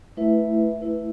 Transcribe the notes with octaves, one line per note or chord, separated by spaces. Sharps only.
A3 E4 B4 E5
A3 E4 B4 E5